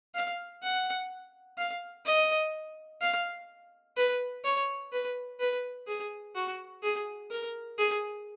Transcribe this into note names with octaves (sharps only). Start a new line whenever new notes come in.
F5
F#5
F5
D#5
F5
B4
C#5
B4
B4
G#4
F#4
G#4
A#4
G#4